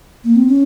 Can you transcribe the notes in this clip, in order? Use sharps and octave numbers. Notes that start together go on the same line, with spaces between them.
A#3
C4
C#4